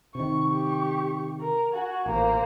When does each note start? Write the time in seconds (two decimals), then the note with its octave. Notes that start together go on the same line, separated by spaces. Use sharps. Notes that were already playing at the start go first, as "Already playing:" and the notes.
0.15 C3 D#3 C#6
0.50 G4 C#6
1.40 A#4
1.73 F#4 G#5
2.06 A1 A#2 A#3 C5